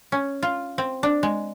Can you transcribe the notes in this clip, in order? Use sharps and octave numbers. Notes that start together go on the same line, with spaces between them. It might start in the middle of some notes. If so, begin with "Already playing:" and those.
C#4
F4
C4
D4
G#3